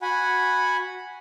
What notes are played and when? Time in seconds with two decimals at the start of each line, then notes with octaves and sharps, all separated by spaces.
0.02 F#4 F#5 G#5 B5